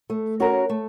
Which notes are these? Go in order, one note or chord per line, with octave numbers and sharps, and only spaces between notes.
A3
C#4 F#4 A#4
A3